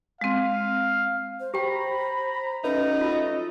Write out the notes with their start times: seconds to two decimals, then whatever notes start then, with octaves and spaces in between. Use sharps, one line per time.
0.21 G#3 C4 F5
1.40 C5
1.54 G4 C5 G5 A#5 B5
2.64 F#3 A3 C#4 D#4 B4
3.01 F4 A4 D#5